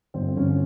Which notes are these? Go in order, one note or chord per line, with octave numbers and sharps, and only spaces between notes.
G1 C4
G1 C#4